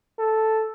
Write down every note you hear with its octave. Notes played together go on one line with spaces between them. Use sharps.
A4